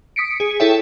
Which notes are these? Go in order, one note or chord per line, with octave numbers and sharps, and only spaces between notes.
D#6 B6 C#7 D7
G#4
E4 G#4 A4 C#5 E5 G5